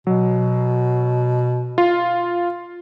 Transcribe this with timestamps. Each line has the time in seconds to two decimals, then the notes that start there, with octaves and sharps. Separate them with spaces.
0.07 B2 F#3
1.78 F4